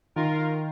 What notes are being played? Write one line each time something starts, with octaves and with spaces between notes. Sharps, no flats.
D#3 F4 A#4